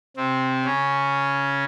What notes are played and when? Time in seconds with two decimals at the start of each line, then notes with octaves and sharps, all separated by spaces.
0.17 C3 C4
0.65 C#3 C#4